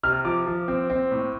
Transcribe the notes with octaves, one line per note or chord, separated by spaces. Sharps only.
C3 F6
F3 D6
F3
C4
C4
A2